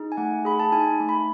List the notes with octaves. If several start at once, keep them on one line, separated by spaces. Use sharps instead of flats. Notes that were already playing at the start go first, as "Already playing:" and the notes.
Already playing: D#4 G#4
G#5
A3 F#5
G#4 B5
A5
D#4 G#5
A3
B5